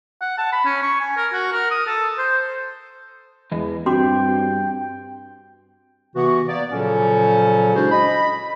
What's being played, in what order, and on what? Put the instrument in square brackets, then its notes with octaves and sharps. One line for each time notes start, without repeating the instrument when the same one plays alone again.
[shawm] F#5
A5
B5
C#4
C#6
G#5
A#4
F#4
A#4
D#6
A4
C5
[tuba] E2 [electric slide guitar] E3 G#3 D#5
[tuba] G2 [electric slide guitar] C4 [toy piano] F#4 C6 D6 [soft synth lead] G5
[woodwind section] C3 E3 B3 F#4
A#3 B3 D5
A#2 C#3 F3 F#3 C#4 A4
G#3 D4 E4 F#4 C5
D#5 B5